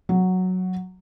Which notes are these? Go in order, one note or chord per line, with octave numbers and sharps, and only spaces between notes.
F#3